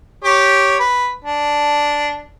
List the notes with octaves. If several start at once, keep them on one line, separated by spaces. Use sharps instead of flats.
G4 C#5
B4
D4